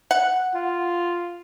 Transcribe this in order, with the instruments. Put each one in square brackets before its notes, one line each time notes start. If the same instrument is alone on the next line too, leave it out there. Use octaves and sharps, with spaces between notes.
[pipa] F#5
[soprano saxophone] F4